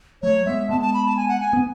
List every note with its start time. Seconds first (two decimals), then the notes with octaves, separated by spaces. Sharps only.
0.22 F#3 A3 C#5
0.46 G#3 B3 E5
0.69 G#3 B3 A5
0.81 A5
0.94 B5
1.05 A5
1.16 G#5
1.28 F#5
1.40 G#5
1.53 B3